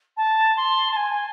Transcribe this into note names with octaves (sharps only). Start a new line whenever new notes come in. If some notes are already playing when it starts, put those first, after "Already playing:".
A5
C6
A5
G#5